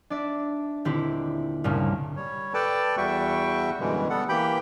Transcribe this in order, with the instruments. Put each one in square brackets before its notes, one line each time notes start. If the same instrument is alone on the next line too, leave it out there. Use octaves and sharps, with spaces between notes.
[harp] D4 D5 E5
D#1 D3 C4 E4 G4
C2 G2 A#2 C#3 A3 A#3
[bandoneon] G3 C#5
A4 B4 D5 G5 A5
E2 G3 F#4 E5 G5 C#6
F#2 B2 D3 E3 G3 G#3
G3 B3 A4 F#5
E3 A#3 G4 G5 B5 G6